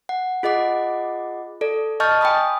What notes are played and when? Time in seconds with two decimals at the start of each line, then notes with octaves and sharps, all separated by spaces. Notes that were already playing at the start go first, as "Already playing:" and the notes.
0.09 F#5
0.43 F4 G#4 D#5 F#5 D6
1.61 A4 D5
2.00 D#5 A5 C#6 F6 G6 A6
2.21 G5 G#5 B5 D#6